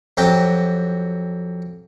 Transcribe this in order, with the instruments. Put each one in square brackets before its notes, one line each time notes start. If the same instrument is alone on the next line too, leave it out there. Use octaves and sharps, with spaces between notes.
[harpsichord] F2 F#3 G4